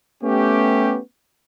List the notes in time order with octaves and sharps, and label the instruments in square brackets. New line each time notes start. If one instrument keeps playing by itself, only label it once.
[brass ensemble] A3 B3 C#4 G4